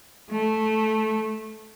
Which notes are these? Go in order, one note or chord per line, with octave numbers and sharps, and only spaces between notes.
A3